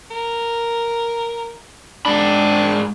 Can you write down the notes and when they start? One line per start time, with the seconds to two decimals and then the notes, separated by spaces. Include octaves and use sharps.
0.11 A#4
2.06 G#2 D4 B5